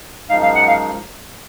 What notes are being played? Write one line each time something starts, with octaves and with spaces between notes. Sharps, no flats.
F#2 F3 G#3 D#4 F5
F5
F#5
F5